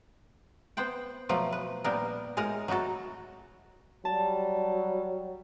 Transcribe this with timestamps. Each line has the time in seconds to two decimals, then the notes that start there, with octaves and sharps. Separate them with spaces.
0.77 B3 C5 F#5 G5
1.29 B2 F3 F#3 A3
1.52 B4
1.84 A#2 G3 B3 D4 G4 A#4
2.37 A2 G#3 D#4 A#4 A#5
2.68 F#3 D#4 E4 F#4 A4
4.05 F#3 G3 A5